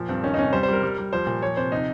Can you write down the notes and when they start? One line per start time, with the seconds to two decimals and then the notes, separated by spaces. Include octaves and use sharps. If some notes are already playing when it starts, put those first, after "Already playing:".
Already playing: A#2 F3
0.09 G2 C4
0.23 D#3 C#4
0.34 D#4
0.38 C3 C#4
0.52 G3 C5
0.63 C5
0.68 G3 A#4
0.83 G3
0.98 G3
1.13 F3 C5
1.27 A#2
1.42 F3 C#5
1.57 C3 C5
1.72 C3 D#4